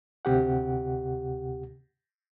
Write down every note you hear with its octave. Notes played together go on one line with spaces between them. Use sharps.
D2 C3 G4 F#5